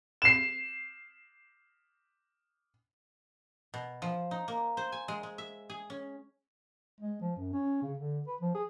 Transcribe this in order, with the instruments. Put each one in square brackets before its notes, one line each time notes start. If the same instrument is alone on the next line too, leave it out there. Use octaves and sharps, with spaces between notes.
[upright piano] C7 E7
[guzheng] B2
F3
D#4
A#3
C5
G#5
G#3
G#3
E5
G#4
C#4
[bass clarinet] G#3
F3
F#2
C#4
C#3
D3
B4
F3
G#4